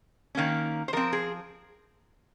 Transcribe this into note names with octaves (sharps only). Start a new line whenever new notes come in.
D#3 A#3 C#4
C5
F3 C4 A#4
G#4